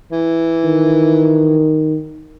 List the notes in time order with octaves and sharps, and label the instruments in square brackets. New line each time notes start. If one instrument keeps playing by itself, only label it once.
[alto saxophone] E3
[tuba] D#3